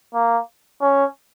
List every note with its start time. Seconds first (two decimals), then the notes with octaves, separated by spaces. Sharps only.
0.14 A#3
0.81 C#4